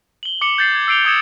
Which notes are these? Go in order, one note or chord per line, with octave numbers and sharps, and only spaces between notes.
F#7 G7
D6 C#7 F#7 G7
G6 A6 C7 F#7
G#6
E6 C7 D7 F7 G7
D6 D#6 G#6 C#7 E7